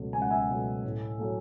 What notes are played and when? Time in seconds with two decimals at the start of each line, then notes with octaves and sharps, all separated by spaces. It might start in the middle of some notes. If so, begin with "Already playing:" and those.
Already playing: C#2 B2 F#3 A3
0.13 C#2 G#5
0.22 F#5
0.31 E5 G#5
0.49 B2 F#3 A3
0.84 A2
1.19 F#3 A3